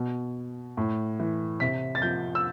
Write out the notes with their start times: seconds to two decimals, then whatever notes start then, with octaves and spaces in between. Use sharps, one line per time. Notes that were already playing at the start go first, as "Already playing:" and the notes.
Already playing: B2
0.77 A2
1.20 E3
1.60 C3 B6
1.95 A6
2.02 F3 G6
2.35 E6